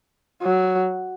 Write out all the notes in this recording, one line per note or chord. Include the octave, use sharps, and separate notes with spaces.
F#3